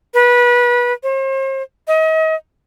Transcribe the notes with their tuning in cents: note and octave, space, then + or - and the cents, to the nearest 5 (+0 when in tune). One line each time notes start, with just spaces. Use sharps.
B4 -25
C5 +40
D#5 +35